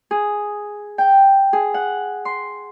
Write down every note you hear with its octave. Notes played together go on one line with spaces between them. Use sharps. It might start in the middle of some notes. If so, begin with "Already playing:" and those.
G#4
G5
G#4
F#5
C6